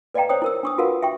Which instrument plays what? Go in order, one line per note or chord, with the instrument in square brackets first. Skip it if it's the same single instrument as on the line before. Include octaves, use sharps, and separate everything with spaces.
[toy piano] B4 D5 D#5 F5 G5 A#5
C5 C#5 G5 D#6
E4 A#4 E6
D4 C#6 D#6
F4 F#4 A#4 B4 F5 F#5
E5 G5 C#6